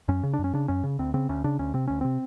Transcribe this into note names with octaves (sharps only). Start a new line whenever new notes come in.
F#2 C#4
C#3
D4
F#2
C#4
C#3 D4
F#2 C#4
C#3
D2 C4
C#3 C4
D2 C#4
C#3 D4
D2 C#4
C3 C4
D2 C#4
C3 C4